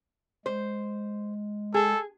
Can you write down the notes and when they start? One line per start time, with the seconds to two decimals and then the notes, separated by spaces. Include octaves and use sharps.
0.46 G#3 C5
1.74 G#4 A4